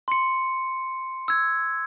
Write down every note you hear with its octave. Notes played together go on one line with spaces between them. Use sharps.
C6 C#7
E6 G#6